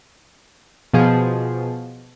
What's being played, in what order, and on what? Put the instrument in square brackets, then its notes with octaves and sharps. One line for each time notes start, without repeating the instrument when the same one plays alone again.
[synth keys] B2 F3 G#4